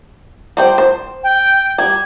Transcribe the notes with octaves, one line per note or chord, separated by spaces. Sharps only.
G3 C5 G5
C5
G5
G3 G#6